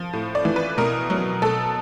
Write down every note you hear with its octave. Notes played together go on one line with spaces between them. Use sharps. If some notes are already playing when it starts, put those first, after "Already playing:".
Already playing: F3
A2
D5
E3
B4
B2 A#4
F#3
B2 A4